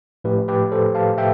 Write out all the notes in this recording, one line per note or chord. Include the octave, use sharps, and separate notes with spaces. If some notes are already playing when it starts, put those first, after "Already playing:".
A2 F3 A3 G4 B4
G4 B4
A4 C5
F5 A5
A2 E5 G5